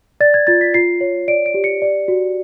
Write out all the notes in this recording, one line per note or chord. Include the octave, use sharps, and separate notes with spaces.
D5 A6
G#6
F4 A6
B6
F4 C7
C#5
D5 D7
D7
G4
C#7
D5
F#4